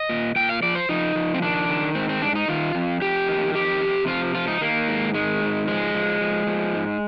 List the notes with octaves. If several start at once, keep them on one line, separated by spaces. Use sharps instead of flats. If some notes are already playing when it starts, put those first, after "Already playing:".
Already playing: D#5
A#2
A#2 G5
F5
F3 D5
C5
F3 D#4
F3
C4
D#3 D4
D#3
G#2 C4
C4
G#2 D4
D#4
D#3 F4
F2
F2 G4
D#3
F2 G4
C3
F3 F4
F3 F4
D#4
D#3 A#3
G#2
D#3 G#3
G#2
F3 G#3
F3
F3
F3
G#2